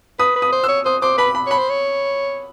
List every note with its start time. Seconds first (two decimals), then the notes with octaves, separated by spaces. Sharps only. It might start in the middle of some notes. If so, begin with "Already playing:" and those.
0.19 B4 D#6
0.36 B4
0.42 D#6
0.52 C5
0.64 E6
0.69 C#5
0.85 C5 D#6
1.02 C5 D6
1.18 B4 B5
1.35 B5
1.47 C#5 B5
1.58 C5
1.70 C#5